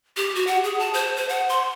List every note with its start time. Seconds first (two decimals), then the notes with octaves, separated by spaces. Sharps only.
0.17 G4
0.35 F#4
0.47 F#5
0.64 G#4
0.79 A5
0.94 C5
1.16 C5
1.29 F#5
1.49 C6